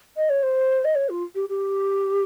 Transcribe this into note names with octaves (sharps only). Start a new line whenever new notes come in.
D#5
C#5
C5
D#5
C#5
F4
G4
G4